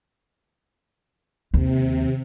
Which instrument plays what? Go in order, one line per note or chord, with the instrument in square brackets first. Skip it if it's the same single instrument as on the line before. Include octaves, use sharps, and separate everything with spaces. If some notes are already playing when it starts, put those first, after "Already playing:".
[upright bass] D#2 [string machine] C3